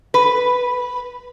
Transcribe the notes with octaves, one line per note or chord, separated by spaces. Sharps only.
B4